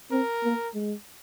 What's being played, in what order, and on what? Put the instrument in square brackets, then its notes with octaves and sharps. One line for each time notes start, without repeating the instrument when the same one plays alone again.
[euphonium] C4 [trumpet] A#4
[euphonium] A#3
G#3